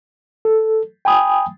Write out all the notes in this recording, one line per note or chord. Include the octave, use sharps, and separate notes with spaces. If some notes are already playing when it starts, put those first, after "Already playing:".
A4
G5 G#5 B5 D#6